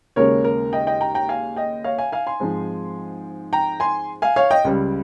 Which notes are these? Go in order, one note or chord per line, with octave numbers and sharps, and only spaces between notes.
D#2 C#3 G#3 C#4 A#4 C#5
A#4
D#5 G5
D#5 G5
G5 A#5
G5 A#5
F5 G#5
D#5 G5
C#5 F5
F5 G#5
F5 G#5
G#5 C6
G#2 F3 G#3 C4
G5 A#5
G#5 C6
F5 G#5
C#5 F5
D#5 G5
C#2 C#3 G3